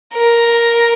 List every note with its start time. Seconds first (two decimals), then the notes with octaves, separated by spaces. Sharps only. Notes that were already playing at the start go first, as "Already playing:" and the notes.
0.15 A#4